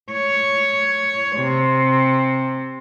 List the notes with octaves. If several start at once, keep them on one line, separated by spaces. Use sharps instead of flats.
C#5
C3